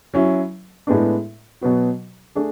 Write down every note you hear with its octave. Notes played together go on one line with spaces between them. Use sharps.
F#3 C#4 E4
A2 G#3 B3 D4
B2 F#3 B3 F#4
A3 D4 G#4